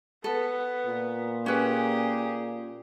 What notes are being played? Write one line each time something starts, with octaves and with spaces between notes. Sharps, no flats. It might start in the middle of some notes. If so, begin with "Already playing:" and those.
B3 A4
A#2
C#4 G4 G#4 B4